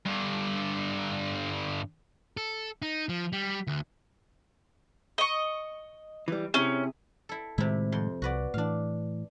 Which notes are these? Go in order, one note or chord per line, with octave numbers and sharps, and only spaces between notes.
G2 D3
A4
D#4
F3
G3
D2
D#5 C#6
E3 G3
C3 C#4 E4 G#4
E4 A4
A2 C3 D#3 G#3 E4
F2 C6
C2 F#4 B4 D5
A2 E3 D4 F5